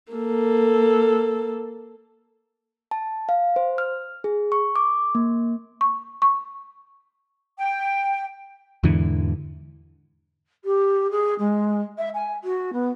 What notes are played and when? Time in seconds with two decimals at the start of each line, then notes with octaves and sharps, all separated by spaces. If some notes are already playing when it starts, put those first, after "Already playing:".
0.12 A#3 A4
2.91 A5
3.29 F5
3.56 C5
3.78 F6
4.24 G#4
4.52 C#6
4.76 D6
5.15 A#3
5.81 C#6
6.22 C#6
7.58 G5
8.83 E2 G#2 D3 E3
10.64 G4
11.11 G#4
11.38 G#3
11.98 E5
12.14 G#5
12.44 F#4
12.73 B3